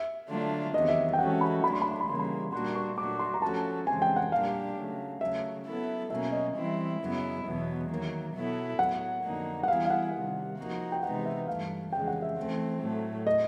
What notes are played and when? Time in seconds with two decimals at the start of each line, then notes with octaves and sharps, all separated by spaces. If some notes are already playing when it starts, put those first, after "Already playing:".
Already playing: E5
0.29 D3 F#3 A3 D4 F4
0.73 E2 C3 D#3 F#3 B3 D#5
0.88 E5
1.13 G5
1.19 E3 G#3 C#4 F#4 A4 F#5
1.41 B5
1.63 F#3 A3 D4 B5
1.73 C6
1.82 B5
1.91 C6
2.01 B5
2.08 C#3 E3 G3 A#3 C6
2.19 B5
2.53 A#2 G3 A#3 D4 F#4 C6
2.75 C#6
2.97 A#2 F#3 A3 D4 F#4 D6
3.19 C6
3.34 A#5
3.42 F3 A3 C#4 F#4 A4 A5
3.87 F2 C#3 E3 G#3 C4 G#5
4.02 G5
4.16 F#5
4.31 A#2 G3 A#3 D4 G4 F5
4.77 C#3 F#3 A3
5.21 C#3 F#3 A3 E5
5.66 F#3 B3 E4 A4
6.10 B2 F#3 A#3 C#4 E5
6.32 D#5
6.55 E3 G3 C4 E4
7.00 F#2 C#3 F#3 B3 E4
7.44 E2 B2 F#3 B3 E5
7.89 D#3 F#3 A#3
8.35 B2 F#3 B3 E4 A4
8.79 A2 F#3 B3 F#5
9.24 F2 D3 F#3 A#3 D#4
9.63 F#5
9.68 E3 G3 B3 E4 G#4 F5
9.85 F5
9.90 F#5
10.13 C3 D#3 G3
10.58 F3 A#3 D#4 F#4
10.92 G5
11.02 C3 E3 G#3 B3 D#4 F#5
11.26 E5
11.47 G2 E3 A3 F5
11.92 F2 C#3 E3 G#3 G5
12.08 F#5
12.22 E5
12.37 E3 A3 C4
12.82 A2 F#3 A3
13.27 D#5